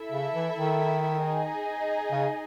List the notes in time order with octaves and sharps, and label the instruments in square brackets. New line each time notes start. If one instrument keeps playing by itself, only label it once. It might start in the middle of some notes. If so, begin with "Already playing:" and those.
Already playing: [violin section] E4 A4 E5
[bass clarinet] C#3
E3
D#3
[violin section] D#4 G#4 D#5
[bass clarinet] C#3